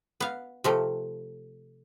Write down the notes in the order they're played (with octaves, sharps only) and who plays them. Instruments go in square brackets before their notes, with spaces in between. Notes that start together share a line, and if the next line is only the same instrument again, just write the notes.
[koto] B3 F5
C3 F3 A3